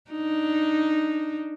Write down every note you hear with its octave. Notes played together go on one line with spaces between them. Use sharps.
D4 D#4